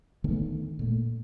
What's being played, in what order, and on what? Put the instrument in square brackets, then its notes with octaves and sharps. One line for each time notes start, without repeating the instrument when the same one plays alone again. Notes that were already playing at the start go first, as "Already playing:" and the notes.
[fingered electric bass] D3 D#3 A3 B3
A#2 A3